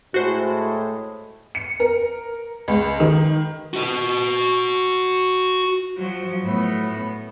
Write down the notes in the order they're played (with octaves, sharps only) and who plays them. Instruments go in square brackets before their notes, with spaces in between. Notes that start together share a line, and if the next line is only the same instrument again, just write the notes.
[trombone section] A2 G#3 [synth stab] F#4 C5
[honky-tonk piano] C#7
A#4
C#2
D#3
[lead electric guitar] F#4 D#5
[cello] F3 F#3
A2 B3